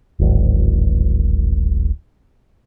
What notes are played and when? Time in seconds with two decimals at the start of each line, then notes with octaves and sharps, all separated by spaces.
0.19 D1 G#1